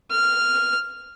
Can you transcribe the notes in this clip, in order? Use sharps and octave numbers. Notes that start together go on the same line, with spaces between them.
F6